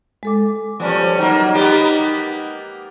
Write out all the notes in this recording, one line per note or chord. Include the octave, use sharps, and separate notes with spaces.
G#3 A4 D6
B2 F3 G3 B3 C#4
F#3 A#3 D#4
A#3 B3 G4